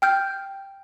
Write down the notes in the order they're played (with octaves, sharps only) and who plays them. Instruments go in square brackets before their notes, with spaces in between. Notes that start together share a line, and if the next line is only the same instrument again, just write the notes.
[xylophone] G5 F6 G6